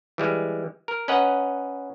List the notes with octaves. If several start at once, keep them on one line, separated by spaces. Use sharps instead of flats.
E3 G3 G#3
A#4
C#4 B4 D#5 F#5 A#5